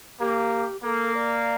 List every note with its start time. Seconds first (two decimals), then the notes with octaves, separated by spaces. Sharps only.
0.20 A#3 G4
0.84 A#3 A4
1.15 D5